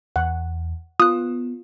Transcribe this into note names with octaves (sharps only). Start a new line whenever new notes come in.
E2 F#5
B3 F4 D#6 F#6